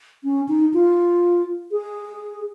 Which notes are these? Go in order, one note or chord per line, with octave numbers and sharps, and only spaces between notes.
C#4
D#4
F4
G#4